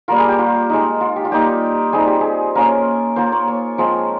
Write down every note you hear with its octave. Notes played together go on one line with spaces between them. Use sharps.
G3 A#3 F4 A#4
G#4
G4
F4
G#3 D#4
F4
G4
F4
G3 A#3 D#4 G4
G3 C4 D#4 G#4
G4
G#4
A#3 C#4 F4 A#4
A#3 F4 C5
C#5
C#5
F3 G#3 C4 F4